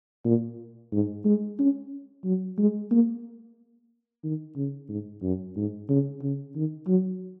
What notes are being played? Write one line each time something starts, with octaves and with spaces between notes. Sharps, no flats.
A#2
G#2
G#3
C#4
F#3
G#3
A#3
D#3
C#3
G#2
F#2
G#2
C#3
C#3
D#3
F#3